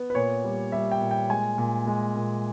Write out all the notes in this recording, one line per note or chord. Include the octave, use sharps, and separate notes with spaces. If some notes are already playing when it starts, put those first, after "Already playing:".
Already playing: B3
B4
A#2 C#5
G3
G3 E5
G5
A#2
G5
G#3 G#5
A#2
G#3
A#2